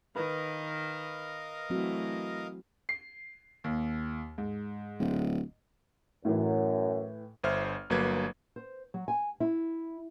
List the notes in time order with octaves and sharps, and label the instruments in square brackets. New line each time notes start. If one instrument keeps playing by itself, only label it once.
[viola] D#3 [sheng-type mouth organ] A#4 D#5 F5 [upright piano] B4
[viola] E3 A3 [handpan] F#3 C4 F#4
[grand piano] C7
D#2
G#2
[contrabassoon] D1
[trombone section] F#2 [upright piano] A2 E3
[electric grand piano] G1 C5 E5 F6
G1 F#3 A#3 B4 G#6
[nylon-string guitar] C5
F#3
G#5
E4